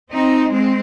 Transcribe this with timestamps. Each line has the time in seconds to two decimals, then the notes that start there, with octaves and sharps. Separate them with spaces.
0.11 C4 D#4
0.52 G#3 C4